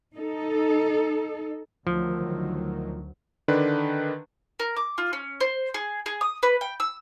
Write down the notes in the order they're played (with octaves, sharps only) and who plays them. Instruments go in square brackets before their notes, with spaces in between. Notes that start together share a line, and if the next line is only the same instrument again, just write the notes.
[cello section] D#4 A4
[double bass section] D2 D#3 F#3 [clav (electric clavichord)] F3
[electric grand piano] D3 D#3 D4 B4
[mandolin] A#4
D6
F4
C#4
C5
G#4
G#4
D#6
B4
G5
E6